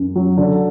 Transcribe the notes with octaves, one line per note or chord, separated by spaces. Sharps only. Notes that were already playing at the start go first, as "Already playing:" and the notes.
Already playing: F#2
F#3
D3